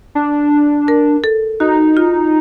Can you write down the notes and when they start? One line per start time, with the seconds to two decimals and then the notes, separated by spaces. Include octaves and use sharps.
0.15 D4
0.88 A#4
1.24 A4
1.60 D#4 F#4
1.97 F4